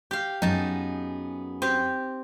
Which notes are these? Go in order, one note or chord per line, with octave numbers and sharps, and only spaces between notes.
G4 F5
F#2 B3 D#4 G#4 A5
C4 G4